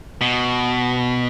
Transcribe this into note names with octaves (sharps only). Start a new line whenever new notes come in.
B2